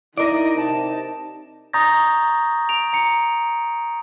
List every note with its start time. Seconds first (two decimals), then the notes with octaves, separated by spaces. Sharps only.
0.18 D#4 E4 A#4 D5 D#5
0.56 C3 A5
1.73 A#5 C#6 D#6 G6 A6 A#6
2.69 D7 F7
2.93 A#5 C#7